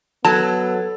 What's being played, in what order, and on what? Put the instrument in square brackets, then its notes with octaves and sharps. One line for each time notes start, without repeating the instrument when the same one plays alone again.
[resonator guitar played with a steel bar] F#3 [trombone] B3 [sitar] A4 [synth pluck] A5